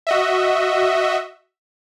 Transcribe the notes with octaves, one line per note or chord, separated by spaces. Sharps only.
F#4 D#5 E5